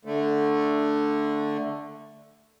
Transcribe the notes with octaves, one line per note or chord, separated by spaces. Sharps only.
D3 A3